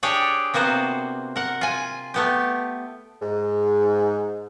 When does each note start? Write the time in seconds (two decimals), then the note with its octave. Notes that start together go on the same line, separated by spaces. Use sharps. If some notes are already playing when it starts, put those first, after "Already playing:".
0.03 D4 G4 G#4 C#5 D5
0.54 C3 A#3 B3 F#4 C5
1.36 A#4 F#5
1.61 F4 G#5
2.14 A3 B3 G4
3.22 G#2